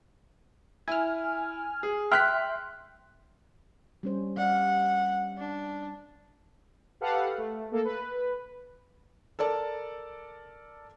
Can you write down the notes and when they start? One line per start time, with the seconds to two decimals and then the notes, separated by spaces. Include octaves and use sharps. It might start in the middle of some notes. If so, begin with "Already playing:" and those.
0.88 E4 G#5 F6
1.83 G#4
2.12 E5 G5 C6 F6 F#6 B6
4.03 G3 C#4 C5
4.37 G3 D5 F5 F#5
5.38 D4
7.01 G4 A4 B4 F5 F#5
7.38 A3
7.71 A#3 A4
7.85 B4
9.39 A4 A#4 D5 A5